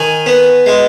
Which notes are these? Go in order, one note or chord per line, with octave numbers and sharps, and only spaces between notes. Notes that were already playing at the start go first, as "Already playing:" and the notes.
Already playing: D#3 G#5
B3
G#3